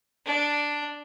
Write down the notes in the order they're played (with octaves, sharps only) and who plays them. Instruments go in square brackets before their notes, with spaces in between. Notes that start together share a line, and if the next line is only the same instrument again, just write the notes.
[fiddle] D4